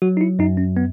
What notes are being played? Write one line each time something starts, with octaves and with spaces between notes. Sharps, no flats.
F#3 F#4
D#4
E4
F#2 D#4
C#4
B3